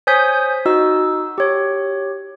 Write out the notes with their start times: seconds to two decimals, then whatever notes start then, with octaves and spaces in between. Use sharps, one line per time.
0.07 C5 C#5 G#5 D#6 G6 B6
0.65 D#4 F#4 D#5 E6
1.38 G4 C#5